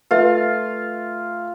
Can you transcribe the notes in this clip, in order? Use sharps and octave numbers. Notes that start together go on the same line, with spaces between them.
A3 F4 B4 E5